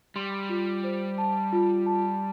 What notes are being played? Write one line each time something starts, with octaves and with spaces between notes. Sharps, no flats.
G3 C6
F4
C5
A5
F4
A5